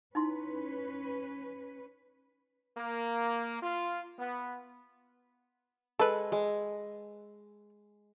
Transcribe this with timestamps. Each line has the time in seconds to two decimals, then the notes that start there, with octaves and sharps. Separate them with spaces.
0.15 C#4 D#4 E4 B4 C6
2.77 A#3
3.62 F4
4.19 B3
5.99 G#3 A4 B4
6.32 G#3